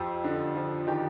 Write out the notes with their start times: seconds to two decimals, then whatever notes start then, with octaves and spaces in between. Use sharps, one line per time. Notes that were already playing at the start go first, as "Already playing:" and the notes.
Already playing: F2 F3 G4
0.24 D3
0.55 F3
0.87 D#3 G4